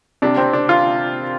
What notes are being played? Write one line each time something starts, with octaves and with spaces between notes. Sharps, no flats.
C3 G3 D4
C4
D4
F4